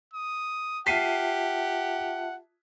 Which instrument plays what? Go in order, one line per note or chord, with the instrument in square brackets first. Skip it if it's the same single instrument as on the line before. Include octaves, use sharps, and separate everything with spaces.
[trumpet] D#6
[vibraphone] F4 E5 A5 [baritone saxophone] G4 [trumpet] F#5 [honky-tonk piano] B6 C7 D#7